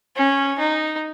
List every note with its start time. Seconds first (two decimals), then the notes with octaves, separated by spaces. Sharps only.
0.16 C#4
0.59 D#4